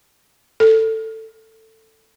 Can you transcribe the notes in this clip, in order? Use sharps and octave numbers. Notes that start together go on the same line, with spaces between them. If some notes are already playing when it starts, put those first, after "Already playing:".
A4